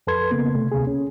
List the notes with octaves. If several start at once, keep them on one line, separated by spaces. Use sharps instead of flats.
F2 A4 B4 C6 G#6
C#3 A#3 B3
C3 A3
C#2 C3 G#4
C#4